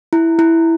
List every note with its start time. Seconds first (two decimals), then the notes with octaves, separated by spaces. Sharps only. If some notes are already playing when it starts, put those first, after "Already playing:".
0.13 E4
0.39 E4